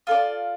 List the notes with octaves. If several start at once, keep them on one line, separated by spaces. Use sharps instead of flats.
F4 A4 D5